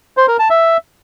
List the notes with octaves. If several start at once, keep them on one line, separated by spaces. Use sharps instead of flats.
C5
A#4
A5
E5